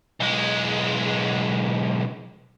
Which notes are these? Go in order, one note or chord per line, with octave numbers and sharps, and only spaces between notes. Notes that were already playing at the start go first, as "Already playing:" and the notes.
B1 G#3